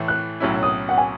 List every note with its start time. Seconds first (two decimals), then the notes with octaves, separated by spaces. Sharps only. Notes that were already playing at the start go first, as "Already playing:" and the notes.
Already playing: A2 E3 A3
0.08 F#6
0.40 B1 A2 F#3 C#4 E4
0.63 D#6
0.89 F#5
0.98 G#5